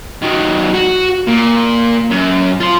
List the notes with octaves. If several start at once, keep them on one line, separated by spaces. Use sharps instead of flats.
D#3 F#3
F#4
A#2
F#2
F4 C5